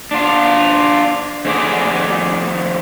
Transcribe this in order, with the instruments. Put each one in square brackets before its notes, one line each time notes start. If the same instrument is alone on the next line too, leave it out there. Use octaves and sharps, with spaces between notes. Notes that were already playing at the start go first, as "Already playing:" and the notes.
[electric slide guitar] D4 F4
F2 A3 G#4 D5